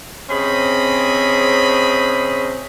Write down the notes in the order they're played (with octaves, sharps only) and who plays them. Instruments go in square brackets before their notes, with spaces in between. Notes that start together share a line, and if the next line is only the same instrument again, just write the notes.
[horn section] C3 C4 C#4 G#4 D#5 B5